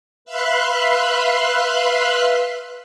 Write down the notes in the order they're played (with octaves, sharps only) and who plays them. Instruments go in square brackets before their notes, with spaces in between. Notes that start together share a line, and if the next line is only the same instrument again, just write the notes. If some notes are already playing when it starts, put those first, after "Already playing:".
[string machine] B4 E5 F5 B5 C6 F#6